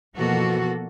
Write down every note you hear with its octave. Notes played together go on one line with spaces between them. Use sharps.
B2 E3 F3 A#3 F#4 A4